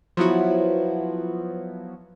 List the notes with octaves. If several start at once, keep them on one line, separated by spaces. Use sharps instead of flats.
F3 F#3 B3 E4 F#4